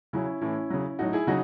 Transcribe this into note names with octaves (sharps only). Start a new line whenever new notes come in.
C#3 F#3 C#4 E4
A2 E3 C#4 E4
C#3 F#3
A2 F#3 D#4 F#4
E4 G#4
C#3 F#3 D#4 F#4